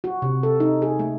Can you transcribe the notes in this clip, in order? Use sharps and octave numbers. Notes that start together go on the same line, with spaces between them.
F#4
C3
A4
D#4
G#4
A3